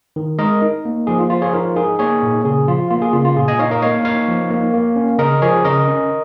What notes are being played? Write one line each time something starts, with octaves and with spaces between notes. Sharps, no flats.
D#3
G#3 A#4 D#5
D#4
A#3
F3 G#4
F4
F3 F4
G#4 C#5
D#4 F4 A#4
D#4 G#4
A#3 G#4 C#5
A#2
C#3 G#4
F3 F4
A#3 F4
G#4
C#3 F4
F4
A#2 G#4
D#5 G#5
D#4 C#5 F5
A#4 D#5
A#3 C#5 F5
D#4 C#5 F5
F3
A#3
A#3
C#4
C#3 A#4 D#5
F3 G#4 C#5
C#3 A#4 D#5
C#4